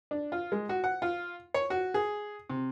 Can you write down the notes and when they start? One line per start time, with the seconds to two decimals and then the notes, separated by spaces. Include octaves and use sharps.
0.11 D4
0.32 F4
0.52 G#3
0.69 F#4
0.84 F#5
1.02 F4
1.54 C#5
1.70 F#4
1.94 G#4
2.50 C3